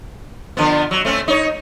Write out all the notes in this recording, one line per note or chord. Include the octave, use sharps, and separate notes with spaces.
D3 F3 B3
F#3
A3 C4 C#4
D#4 C#5